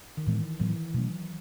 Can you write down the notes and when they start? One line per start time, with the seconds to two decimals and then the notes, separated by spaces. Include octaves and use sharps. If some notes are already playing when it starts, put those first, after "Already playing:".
0.17 D#3
0.27 A2 E3 G#3 B3
0.60 A2 E3 F#3 B3
0.94 B2 F#3 A3 C#4